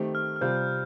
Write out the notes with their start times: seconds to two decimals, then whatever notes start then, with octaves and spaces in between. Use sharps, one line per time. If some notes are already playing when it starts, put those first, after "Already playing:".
Already playing: D#3 A3 C4 G4
0.15 F6
0.36 F6
0.41 C3 G3 C4 F4 G6